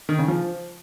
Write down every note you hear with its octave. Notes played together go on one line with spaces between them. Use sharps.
D#3
C#3
F3